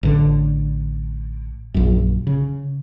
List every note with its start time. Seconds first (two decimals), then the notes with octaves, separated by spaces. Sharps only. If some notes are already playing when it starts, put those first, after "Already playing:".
0.03 A1 D3
1.74 A#1 F#2
2.27 C#3